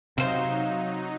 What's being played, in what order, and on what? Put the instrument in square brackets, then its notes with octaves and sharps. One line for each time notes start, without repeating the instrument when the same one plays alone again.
[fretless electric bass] C3 [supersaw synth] F#3 D#4 [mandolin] C5 F5